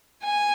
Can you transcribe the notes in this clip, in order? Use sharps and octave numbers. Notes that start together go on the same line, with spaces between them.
G#5